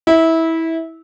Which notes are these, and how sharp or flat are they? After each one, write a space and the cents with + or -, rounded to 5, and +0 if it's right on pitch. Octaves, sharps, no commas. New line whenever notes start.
E4 -20